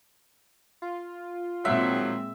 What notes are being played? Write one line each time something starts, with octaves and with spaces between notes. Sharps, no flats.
F4
A#2 D#3 F3 F#3 G#3 C4 E5